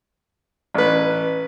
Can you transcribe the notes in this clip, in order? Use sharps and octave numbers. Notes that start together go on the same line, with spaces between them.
A1 B4